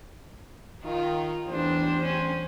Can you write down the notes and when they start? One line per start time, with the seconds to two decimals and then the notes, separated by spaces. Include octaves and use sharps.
0.84 D#3 F4
1.48 A1 E2 G3 D4 C5
2.04 C#4